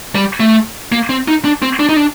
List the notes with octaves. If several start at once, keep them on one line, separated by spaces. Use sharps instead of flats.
G3
A3
A#3
C4
D#4
D4
C4
D4
D#4
D4